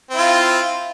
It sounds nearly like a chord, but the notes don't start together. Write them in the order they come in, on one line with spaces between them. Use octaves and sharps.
C4 E4 F4